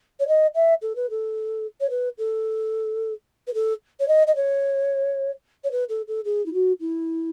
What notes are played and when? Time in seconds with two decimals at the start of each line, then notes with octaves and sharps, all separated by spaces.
0.20 C#5
0.28 D#5
0.55 E5
0.82 A4
0.96 B4
1.10 A4
1.80 C#5
1.90 B4
2.18 A4
3.47 B4
3.54 A4
4.00 C#5
4.08 D#5
4.27 D#5
4.36 C#5
5.64 C#5
5.71 B4
5.89 A4
6.08 A4
6.25 G#4
6.46 E4
6.53 F#4
6.80 E4